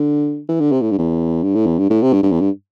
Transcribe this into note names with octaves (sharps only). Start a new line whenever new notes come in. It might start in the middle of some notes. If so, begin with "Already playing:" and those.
Already playing: D3
E3
D3
C3
A2
G2
E2
G2
A2
E2
G2
A2
C3
G2
G2
E2
G2